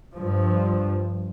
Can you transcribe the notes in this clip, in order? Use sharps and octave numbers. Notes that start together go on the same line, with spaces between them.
G2 F3